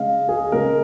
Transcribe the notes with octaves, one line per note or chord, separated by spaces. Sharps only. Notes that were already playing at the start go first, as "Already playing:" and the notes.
Already playing: C#3 G#3 C#4 D#5 F5
G#4
C#3 G#3 C#4 A#4